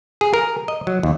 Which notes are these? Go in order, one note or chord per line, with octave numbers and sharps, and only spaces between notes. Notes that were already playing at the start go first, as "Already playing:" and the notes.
G#4
A#4
D#5
F#3
D#2